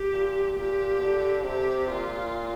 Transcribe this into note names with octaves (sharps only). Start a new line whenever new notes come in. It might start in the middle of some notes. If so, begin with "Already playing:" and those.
Already playing: G4
A#2
A#2 G4
D3
C3 G4
A#2 F4